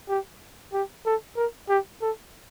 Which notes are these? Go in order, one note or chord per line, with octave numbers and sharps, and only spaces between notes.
G4
G4
A4
A#4
G4
A4